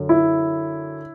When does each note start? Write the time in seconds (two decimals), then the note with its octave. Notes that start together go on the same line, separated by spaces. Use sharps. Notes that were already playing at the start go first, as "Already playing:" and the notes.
Already playing: F#2 D3
0.09 E4